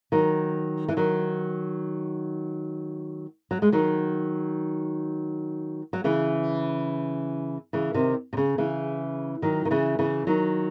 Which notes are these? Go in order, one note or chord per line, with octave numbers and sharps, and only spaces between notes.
D#3 F#3
E3
D#3 F#3
F#3
G#3
D#3 F#3
F#3
C#3 E3
C#3 E3
C3 D#3
C3
C#3
C#3 E3
D#3 F#3
D#3
C#3 E3
C#3 E3
D#3 F#3